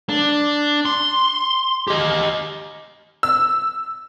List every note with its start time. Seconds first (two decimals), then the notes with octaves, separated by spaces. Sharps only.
0.09 D4
0.85 C6
1.88 G4 D#5
3.23 E6